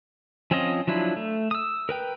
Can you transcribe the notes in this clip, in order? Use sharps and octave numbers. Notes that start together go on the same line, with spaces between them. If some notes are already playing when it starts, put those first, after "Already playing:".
F3 C4 C#4 F4 D#5
F3 F#3 D4 E4 F4
A3
D#6 E6
A#4 B4 G5